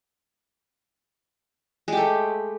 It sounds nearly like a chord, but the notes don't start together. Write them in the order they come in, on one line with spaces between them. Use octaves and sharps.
G#3 G4 A3